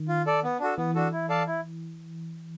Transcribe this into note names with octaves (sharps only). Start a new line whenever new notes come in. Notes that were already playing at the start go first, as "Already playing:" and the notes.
Already playing: D#3
F4
A4 D5
B3
D4 F#4 A4
E3 B3
D4 F#4 A4
E4
A4 D5 F5 A5
E4